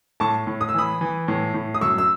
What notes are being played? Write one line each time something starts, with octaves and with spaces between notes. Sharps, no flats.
A2 A5 C#6
A2
D#6
E6
E3 B5 D#6
E3
A2
A2
D#6
F#2 C#6 E6
E6